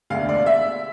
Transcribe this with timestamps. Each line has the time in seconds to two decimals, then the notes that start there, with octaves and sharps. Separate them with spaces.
0.10 E1 D2 D3 F5
0.29 D5
0.46 E5